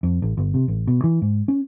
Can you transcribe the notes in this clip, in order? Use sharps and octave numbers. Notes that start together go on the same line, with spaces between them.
F2
A1
G1
C3
A1
B2
E3
G#2
C#4